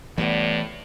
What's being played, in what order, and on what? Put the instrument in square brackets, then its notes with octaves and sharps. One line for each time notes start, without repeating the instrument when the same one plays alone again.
[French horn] A2 [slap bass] E3 A3 [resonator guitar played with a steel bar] G3 B3